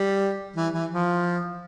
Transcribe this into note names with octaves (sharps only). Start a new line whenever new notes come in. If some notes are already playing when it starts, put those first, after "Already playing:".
Already playing: G3
E3
E3
F3